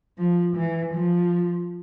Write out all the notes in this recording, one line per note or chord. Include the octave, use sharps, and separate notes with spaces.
F3
E3
F3